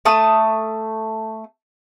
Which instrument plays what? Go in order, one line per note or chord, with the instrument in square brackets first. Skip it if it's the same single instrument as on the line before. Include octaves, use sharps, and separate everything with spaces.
[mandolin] A3 A5 D#6